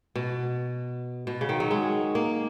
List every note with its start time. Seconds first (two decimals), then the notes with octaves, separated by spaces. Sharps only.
0.15 B2
1.27 B2
1.41 C#3
1.49 D#3
1.60 F#3
1.71 G#3
2.15 A#3